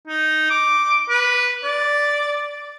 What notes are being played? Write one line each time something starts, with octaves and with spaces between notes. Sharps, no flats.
D#4
D6
B4
D5